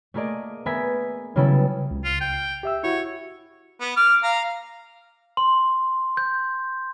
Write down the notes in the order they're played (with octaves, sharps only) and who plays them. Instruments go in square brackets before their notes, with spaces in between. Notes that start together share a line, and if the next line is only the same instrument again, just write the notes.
[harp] A3 A#3 G#4 A#4 D5 D#5
B3 A#4 E5 G#5 B6
C#3 F#3 G3 B3 E4 A4
[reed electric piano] C#2
[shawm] F4
G5
[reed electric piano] G4 E5 E6
[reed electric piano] E4 F#4 [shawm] C#5
[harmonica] B3
D6 F6
F5 A#5
[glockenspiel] C6
G6